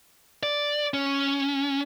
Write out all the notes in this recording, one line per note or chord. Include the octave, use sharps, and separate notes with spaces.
D5
C#4